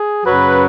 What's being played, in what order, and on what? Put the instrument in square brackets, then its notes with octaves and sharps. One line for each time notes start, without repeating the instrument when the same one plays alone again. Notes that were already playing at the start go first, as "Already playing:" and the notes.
Already playing: [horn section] G#4
F#2 C#3 F#3 B4